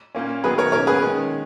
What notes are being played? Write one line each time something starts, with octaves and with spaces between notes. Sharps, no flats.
A#2 A#3 C#4
D#3 F#3 B3 G#4 B4
A#4 C#5
B2 A#3 C#4 A#4 C#5
G#4 B4
D#3 G#3 C#4